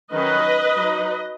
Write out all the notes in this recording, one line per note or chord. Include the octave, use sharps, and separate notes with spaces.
D#3 F#3 C#4 B4 D#5
F#3 D#4